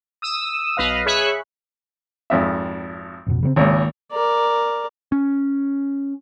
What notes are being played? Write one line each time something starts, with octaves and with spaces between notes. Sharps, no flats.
D#6 E6
B1 B4 D#5 F5
G#4 C#5 E5 B5 C#6 F#6
G#1 F2 E5
A1 F2 B2
C#3 E3 C4
G#1 C#2 D#3 A#3
A#4 D5
C#4